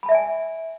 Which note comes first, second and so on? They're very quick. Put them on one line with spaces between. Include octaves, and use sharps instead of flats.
B5 A5 E5 D5 G#5